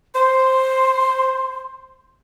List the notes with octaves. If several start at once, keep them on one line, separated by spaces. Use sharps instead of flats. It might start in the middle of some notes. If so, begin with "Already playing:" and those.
C5 C6